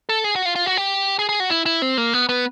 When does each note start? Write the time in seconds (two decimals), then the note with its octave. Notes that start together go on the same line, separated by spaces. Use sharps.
0.09 A4
0.24 G#4
0.36 F#4
0.45 F4
0.56 F4
0.66 F#4
0.77 G4
1.19 G#4
1.29 G#4
1.40 F#4
1.50 E4
1.66 E4
1.82 C4
1.98 A#3
2.14 B3
2.29 B3